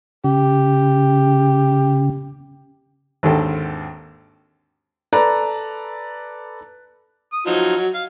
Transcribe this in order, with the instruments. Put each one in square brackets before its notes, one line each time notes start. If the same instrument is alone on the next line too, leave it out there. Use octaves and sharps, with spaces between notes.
[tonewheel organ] C#3 [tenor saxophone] G4
[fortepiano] G#1 D#2 D3 A4 G5
[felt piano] A4 B4 D5 A#5
[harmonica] D#6
F3 F#3 D#4
F#3
F5